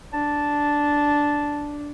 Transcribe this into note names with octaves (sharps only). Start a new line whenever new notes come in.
D4 A5